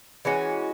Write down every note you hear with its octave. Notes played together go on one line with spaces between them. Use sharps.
E3 G#3 C#4 F#4